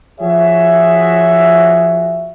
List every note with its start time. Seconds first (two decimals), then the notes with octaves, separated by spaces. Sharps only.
0.20 F3 F#4 G#4 C#5 E5